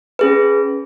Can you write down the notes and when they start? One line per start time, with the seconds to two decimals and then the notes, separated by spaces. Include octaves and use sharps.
0.19 C#4 G#4 B4